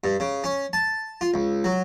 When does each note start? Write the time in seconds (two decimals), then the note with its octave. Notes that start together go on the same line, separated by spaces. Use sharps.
0.04 G2
0.20 C#3
0.44 C#4
0.73 A5
1.21 F4
1.34 C#2
1.64 F#3